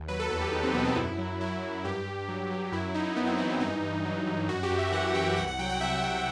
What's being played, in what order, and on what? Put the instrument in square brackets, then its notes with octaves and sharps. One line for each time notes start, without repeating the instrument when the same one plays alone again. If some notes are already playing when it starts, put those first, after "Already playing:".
Already playing: [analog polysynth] D#2
F#3 B4
A4
E2 A4
G4
E2 D#4
C4
B2 B3
C4
F#2 E4
F#3
F#3 E4
F#2
G2 G4
G2
F#3
F#3
F#2 E4
F#2 D#4
F#2 B3
C4
E3 D#4
C4
G2 D#4
G2
F#3
G2
F#2 F#4
G4
F#2
E5
E3 F#5
E3 G5
C2 F#5
F#5
F#3 G5
F#5
C3 E5
C3 E5